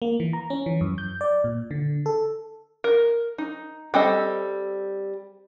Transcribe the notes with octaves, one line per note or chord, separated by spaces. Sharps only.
A#3
E3
A#5
C#4
E3
F#2
G6
D5
A#2
D3
A4
A#4
D#4
G3 C4 A4 D#5